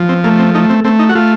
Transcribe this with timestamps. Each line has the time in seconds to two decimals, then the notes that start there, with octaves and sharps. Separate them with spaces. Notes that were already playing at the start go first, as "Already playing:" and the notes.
Already playing: F3
0.09 C4
0.24 A3 A#3
0.39 C4
0.54 A3 D#4
0.70 C4
0.84 A3 C4
0.99 D#4
1.09 F#4
1.15 A3 F4